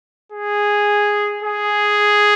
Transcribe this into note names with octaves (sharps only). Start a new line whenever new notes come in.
G#4
G#4